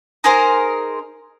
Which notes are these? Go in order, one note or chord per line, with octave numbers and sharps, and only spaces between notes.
D#4 G#4 A#4 C5